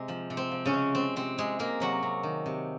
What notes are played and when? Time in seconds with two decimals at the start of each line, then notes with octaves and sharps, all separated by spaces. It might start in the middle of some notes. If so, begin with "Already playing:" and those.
Already playing: C3 G#3
0.08 F3
0.30 C3
0.37 C4
0.51 F3
0.66 C#3 C#4
0.73 G#3
0.95 G#3 C4
1.16 C3 C4
1.38 C3 G#3 G#4
1.59 G#3 A#3 A#4
1.80 C3 F#3 F#4
2.03 C3
2.23 D#3
2.46 C3